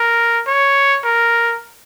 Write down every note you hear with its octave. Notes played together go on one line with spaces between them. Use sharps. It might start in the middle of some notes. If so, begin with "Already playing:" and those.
Already playing: A#4
C#5
A#4